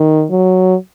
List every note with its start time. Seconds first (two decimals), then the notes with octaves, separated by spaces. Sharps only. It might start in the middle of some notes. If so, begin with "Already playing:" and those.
Already playing: D#3
0.31 F#3